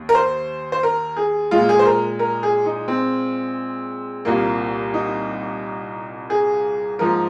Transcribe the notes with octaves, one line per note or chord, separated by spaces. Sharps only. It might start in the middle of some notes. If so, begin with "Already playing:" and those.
Already playing: D#2
A#4
C5
C5
A#4
G#4
A#2 G#3 F4
G#4
C5
A#4
A#4
G#4
D#4
C4
C2 A#2 A#3
D#4
G#4
G#2 F3 A#3 A#4